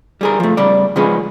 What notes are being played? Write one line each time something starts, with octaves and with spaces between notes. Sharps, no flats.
G3 G#4 A#4
F3 A3
C#3 G3 D5
C#3 F3 G#3 C#4 G#4 B4